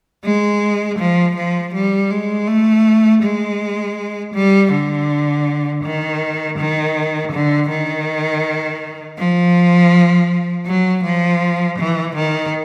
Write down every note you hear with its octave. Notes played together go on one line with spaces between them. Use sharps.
G#3
F3
F3
G3
G#3
A3
G#3
G3
D3
D#3
D#3
D3
D#3
F3
F#3
F3
E3
D#3